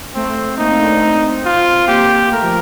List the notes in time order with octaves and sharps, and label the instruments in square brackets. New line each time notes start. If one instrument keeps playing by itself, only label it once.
[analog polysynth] A3 [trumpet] C4
[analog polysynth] A#3 [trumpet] D#4
[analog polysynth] C4
D4
C4
[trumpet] F4
[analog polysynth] A#3 [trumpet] G4
[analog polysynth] A3 [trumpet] A#4
[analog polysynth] F3